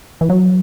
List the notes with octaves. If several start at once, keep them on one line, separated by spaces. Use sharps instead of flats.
E3
F#3